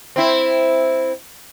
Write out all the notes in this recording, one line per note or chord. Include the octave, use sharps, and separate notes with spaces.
C4 E4